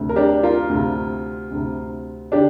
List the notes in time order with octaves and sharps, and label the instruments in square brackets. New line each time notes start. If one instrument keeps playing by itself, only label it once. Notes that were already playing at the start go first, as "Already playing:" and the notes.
Already playing: [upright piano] D2 C3
A#4
D4 G4
F4 A#4
D2 C3
D2 C3
D3 D4 G4